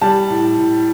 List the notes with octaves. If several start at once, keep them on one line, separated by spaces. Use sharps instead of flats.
G3 A5
A2
A2